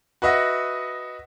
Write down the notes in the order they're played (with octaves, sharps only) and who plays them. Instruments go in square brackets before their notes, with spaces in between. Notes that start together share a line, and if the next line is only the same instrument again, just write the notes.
[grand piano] F#4 B4 D#5 E5 F#5